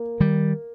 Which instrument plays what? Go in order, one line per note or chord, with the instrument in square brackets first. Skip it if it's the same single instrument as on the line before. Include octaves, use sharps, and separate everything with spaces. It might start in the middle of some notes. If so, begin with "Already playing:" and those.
Already playing: [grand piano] A#3
[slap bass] D#3 G3